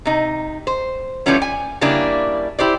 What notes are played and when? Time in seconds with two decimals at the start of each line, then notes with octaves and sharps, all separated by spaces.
0.05 C3 D#4
0.67 C5
1.26 F3 G3 A3 B3 C#4 E4
1.42 G#5
1.81 C#3 G3 A#3 D4 E4
2.59 E4 G4 C5 D5